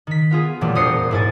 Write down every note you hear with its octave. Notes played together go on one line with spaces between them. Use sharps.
D#3 B6
B3 F4 G#4
A#2 E3 F#3 G3 A3
E1 A#4 C5 D#6 C7 C#7
G#2 E4 G#5 A6